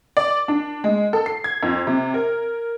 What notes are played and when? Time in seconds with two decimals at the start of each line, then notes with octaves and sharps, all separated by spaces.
0.17 D5
0.48 D4
0.84 G#3
1.13 A4
1.26 C7
1.44 G#6
1.63 F2
1.87 C3
2.14 A#4